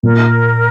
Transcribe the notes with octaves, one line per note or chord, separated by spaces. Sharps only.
A#2 A#4